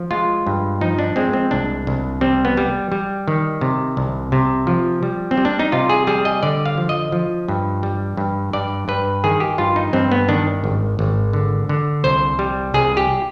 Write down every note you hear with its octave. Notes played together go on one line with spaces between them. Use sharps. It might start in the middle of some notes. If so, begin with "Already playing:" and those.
Already playing: F3
G#3 F4
G2
F3 D#4
D4
G#3 C4
C4
C2 D4
C2
G3 C4
B3
G3
G3
D#3
C3
C2
C3
F3
G3
C4
G3
D4
D#4
C3 F4
G#4
G3 G#4
D#5
D3 D5
F5
F3
D#5
F3
G2
G3
G2
G2 D5
G2 B4
D#3 G#4
G4
G2 F4
D#4
G2 C4
B3
D#3 D4
G#1
G#1
D3
D3
C2 C5
G3
C2 G#4
G4